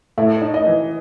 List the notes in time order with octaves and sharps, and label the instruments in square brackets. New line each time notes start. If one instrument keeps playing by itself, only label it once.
[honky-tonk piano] A2 [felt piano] E5
[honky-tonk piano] D#4
[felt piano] D#5
[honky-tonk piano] E3